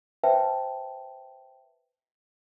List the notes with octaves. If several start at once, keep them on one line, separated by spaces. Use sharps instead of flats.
B4 C5 E5 G5 A5